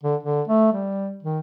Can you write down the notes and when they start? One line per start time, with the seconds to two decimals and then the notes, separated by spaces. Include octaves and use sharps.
0.04 D3
0.23 D3
0.48 A3
0.73 G3
1.23 D#3